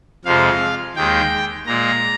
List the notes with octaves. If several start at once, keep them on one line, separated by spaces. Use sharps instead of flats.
F2 C3 F3 G#3 F5
D#2 D#3 G#3 G5
A#2 G#3 A#5